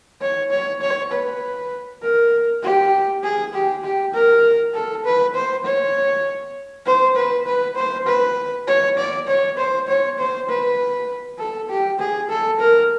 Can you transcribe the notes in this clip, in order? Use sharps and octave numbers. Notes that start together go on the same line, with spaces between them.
C#5
C#5
C#5
B4
A#4
G4
G#4
G4
G4
A#4
A4
B4
C5
C#5
C5
B4
B4
C5
B4
C#5
D5
C#5
C5
C#5
C5
B4
A4
G4
G#4
A4
A#4